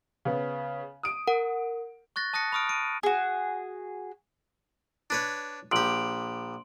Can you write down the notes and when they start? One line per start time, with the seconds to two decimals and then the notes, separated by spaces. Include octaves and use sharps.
0.25 C#3 B3
1.03 D#6 D7
1.28 A#4 F#5
2.16 C#6 F#6 A6 A#6
2.33 A5 D#6 F#6 A#6 C#7
2.52 B5 C#6 D#6 F6 D7
2.69 D7 D#7
3.03 F#4 G#4
5.10 D4 B4 C#5
5.72 A#1 G4 C6 D7 F#7